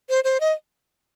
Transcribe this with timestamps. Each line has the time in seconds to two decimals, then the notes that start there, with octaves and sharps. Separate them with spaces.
0.09 C5
0.24 C5
0.40 D#5